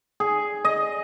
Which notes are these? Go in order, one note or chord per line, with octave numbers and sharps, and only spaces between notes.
G#4
D#5